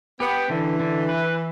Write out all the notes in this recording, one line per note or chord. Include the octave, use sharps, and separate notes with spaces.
B3 G4
D3 E3
D3
B4